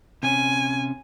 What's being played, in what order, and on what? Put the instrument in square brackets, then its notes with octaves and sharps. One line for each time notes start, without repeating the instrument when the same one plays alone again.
[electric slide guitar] C3 C#4 [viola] G#5